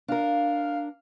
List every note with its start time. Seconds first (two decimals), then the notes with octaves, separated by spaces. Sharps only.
0.08 D4 A#4 F5